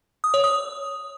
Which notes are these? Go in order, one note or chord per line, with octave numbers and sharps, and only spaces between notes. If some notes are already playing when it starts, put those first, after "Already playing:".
D#6
C#5
D#6